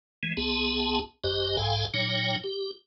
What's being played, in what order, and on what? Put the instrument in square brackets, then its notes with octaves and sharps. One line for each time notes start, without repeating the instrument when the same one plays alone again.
[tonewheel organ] E3 G#3
C2 B3 G#4 A5
G#1 F#2 G4 C5 D#5
B1 G#2 A4 F5 G5 G#5
A#2 F#3 D#4 C#5 G5
G4